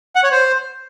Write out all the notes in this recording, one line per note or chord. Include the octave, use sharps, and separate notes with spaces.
F#5
C#5
C5